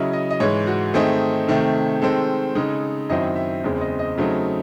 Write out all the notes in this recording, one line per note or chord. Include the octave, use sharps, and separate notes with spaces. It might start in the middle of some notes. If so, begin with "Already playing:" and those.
Already playing: C#3 F#3 C#4 E4 D#5
D#5
D#5
G#2 E3 G#3 C#5
F#4
D#3 A3 C4 D#4 G#4
C3 D#3 A3 C4
D#3 G#3 C4 A4
C#3 G#3 D#4
F#2 D#3 F#3 C4 E4 D#5
E5
E2 C#3 G#3 C4
D#5
D#5
C#3 F#3 A3 C4 D#4